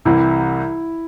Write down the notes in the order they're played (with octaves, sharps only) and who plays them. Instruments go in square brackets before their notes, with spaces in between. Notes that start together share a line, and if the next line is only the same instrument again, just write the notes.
[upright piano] C2 C3 E3 [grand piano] E4